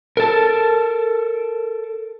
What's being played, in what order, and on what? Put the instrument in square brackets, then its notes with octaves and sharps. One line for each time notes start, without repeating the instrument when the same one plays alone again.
[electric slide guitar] A4 A#4